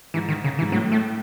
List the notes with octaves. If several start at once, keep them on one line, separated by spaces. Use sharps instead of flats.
G#2 E3
D#3
C#3
E3
G#2
A2 F#3
A3